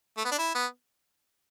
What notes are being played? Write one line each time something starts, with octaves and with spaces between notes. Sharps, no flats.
A3
B3
D4
E4
B3